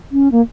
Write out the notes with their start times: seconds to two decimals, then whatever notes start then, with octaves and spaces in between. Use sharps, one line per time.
0.12 C#4
0.32 A#3